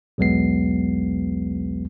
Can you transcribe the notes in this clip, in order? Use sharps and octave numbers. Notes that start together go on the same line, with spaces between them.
B1 E2 F#3 G#3 B3 C7